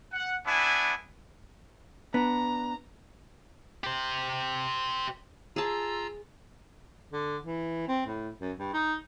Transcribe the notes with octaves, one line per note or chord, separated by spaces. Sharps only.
F#5
B3 D4 E4 G#5
B3 D4 A#5
G4 C5
F4 G#4 A5 A#5 E6
D3
E3
C4
A2
F#2
G2
D#4